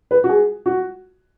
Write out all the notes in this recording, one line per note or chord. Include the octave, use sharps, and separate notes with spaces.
B4
F#4
G#4
F#4